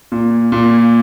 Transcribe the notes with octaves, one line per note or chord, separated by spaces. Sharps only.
A#2
A#2